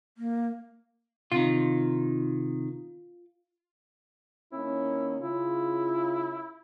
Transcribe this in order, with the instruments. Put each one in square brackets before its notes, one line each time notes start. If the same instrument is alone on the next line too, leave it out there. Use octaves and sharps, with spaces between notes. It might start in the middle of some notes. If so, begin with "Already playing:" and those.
[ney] A#3
[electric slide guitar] C3 D#3 [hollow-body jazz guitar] F4
[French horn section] D#3 A#3 C#4 [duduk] E4
[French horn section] C#3 F4 [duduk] E4